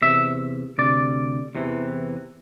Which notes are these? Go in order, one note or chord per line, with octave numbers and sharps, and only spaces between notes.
E2 C3 E5
D2 C3 D5
E2 C3 E3